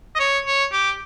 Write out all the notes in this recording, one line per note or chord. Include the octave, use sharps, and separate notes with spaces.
D#5
C#5
C#5
G4